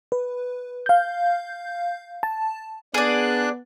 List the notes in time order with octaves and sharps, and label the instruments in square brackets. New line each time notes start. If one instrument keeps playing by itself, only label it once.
[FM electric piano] B4
F5 G6
A5
[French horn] B3 [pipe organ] D4 F#6 [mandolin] G#4 D5